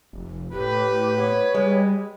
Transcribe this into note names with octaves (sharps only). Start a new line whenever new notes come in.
F1
A2 G4 B4
B3 C#5
G3 G#3